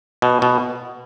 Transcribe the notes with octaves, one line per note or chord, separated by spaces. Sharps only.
B2
B2